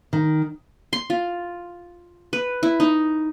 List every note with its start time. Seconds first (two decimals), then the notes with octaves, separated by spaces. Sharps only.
0.13 D#3
0.93 C6
1.10 F4
2.33 B4
2.63 E4
2.80 D#4